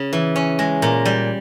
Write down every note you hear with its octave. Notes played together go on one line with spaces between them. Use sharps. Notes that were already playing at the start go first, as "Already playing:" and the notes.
Already playing: C#3
E3
C#4
G#3
A#2
G3